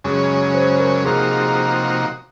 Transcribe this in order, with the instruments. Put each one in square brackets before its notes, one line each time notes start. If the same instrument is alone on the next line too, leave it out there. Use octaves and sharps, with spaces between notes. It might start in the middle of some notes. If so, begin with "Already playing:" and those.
[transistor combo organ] F#2 C#3 G#3 C#4 [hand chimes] G#4
[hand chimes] C5
A#4
[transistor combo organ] C3 F3 A#3 D#4 F#4 [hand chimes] G#4